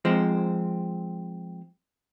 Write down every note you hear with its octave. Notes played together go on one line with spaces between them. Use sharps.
F3 G#3 C4